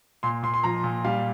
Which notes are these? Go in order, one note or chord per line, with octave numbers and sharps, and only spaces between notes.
A#2 C6
A#2 C6
C6
F3 A#5
A#2
G3 F5